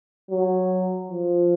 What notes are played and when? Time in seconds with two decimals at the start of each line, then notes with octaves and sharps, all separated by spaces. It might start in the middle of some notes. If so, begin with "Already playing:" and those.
0.30 F#3
1.10 F3